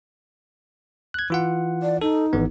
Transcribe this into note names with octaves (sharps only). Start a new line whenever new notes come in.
F#6 G#6
E3 F4 F#5
D5
D#4 A4
G#1 E3 B3